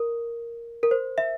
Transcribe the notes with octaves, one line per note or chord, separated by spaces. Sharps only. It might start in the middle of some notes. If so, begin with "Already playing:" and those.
Already playing: A#4
A#4
C5
E5